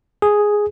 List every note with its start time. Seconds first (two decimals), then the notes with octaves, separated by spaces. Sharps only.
0.22 G#4